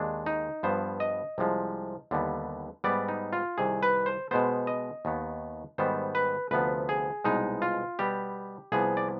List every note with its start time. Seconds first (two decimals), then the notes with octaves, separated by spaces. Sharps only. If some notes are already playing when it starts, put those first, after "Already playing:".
Already playing: D#2 D#3 G#3 D4
0.26 D#4
0.63 G2 F3 B3 C5
1.00 D#5
1.38 C2 C3 F3 G#3
2.11 D#2 D3 G3 B3
2.84 G#2 G3 B3 D5
3.08 D#4
3.33 F4
3.58 C2 C3 D#3 G#4
3.83 B4
4.06 C5
4.31 B2 G#3 B3 C5
4.67 D#5
5.05 D#2 D#3 B3
5.78 G#2 D#3 G3 B3 C5
6.15 B4
6.51 D2 C3 F3 B3 B4
6.89 G#4
7.24 C2 B2 G#3 B3 D#4
7.62 F4
7.99 B2 G3 B3 G4
8.72 C2 C3 F3 B3 G#4
8.97 D5